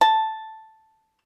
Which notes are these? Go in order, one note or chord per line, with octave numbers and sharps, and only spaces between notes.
A5